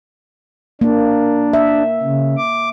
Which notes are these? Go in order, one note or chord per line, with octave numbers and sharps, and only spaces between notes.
A#3 D4
E5
C#3
D6